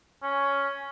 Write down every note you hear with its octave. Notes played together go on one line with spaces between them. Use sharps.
C#4